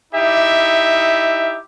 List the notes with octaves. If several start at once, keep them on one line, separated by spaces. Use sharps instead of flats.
D#4 E4 G4 E5